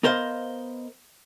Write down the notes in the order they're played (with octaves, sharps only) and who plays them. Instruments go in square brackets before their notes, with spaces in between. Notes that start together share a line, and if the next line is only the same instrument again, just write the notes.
[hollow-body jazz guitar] B3 A#4 C5 D#5 F5